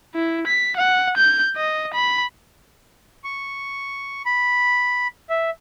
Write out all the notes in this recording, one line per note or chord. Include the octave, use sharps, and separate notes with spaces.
E4
B6
F#5
G6
D#5
B5
C#6
B5
E5